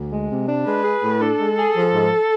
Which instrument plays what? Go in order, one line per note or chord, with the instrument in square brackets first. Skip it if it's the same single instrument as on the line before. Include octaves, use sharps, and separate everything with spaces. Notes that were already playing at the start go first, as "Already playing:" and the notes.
Already playing: [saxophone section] D2
G#3
C3
D4
[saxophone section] G#3 [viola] B4
[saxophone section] G#4
A2
[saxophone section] D4 [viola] A4
[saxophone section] G#3
G#4
F3
G#2